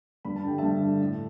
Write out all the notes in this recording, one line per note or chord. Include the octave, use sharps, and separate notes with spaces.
G2 B5
A5
D3 G3 G5
G2 E5 A5
D3 G3
A2